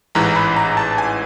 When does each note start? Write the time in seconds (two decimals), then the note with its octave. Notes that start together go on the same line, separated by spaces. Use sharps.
0.15 A1 G#2 E3 A#5
0.36 B5
0.56 A#5
0.77 A5
0.98 G#5